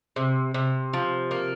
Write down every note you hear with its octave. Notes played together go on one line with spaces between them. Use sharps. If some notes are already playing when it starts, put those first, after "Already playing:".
C3
C3
F3
A#3